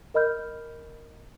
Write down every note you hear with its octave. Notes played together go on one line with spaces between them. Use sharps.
A#4 D#5 B5 F6 G6